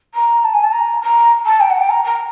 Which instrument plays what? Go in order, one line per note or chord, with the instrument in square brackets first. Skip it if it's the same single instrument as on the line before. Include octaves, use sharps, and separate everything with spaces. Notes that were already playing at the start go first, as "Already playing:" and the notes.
[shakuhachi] A#5
A5
G#5
A5
A#5
A#5
A5
G5
F#5
G5
A#5
A#5